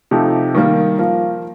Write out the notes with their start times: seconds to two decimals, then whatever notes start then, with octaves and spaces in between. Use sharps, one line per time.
0.11 C3 F3 A3 D#4 G4
0.55 D#3 G3 A#3
0.98 F3 A#3 F4